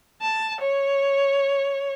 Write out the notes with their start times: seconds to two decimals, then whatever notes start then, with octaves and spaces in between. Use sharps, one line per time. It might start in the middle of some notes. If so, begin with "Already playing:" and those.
0.22 A5
0.61 C#5